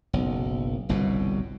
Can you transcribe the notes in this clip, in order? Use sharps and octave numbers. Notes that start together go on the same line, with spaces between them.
F#1 B1
G1 C2 F#2 B2